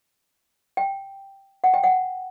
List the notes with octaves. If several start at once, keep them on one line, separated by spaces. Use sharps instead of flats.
G5
F#5
G5
F#5